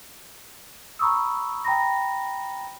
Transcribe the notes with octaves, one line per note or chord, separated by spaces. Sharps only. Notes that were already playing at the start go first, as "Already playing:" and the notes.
A#5 B5 C#6 D#6 E6
G5 A#5 B5 A#6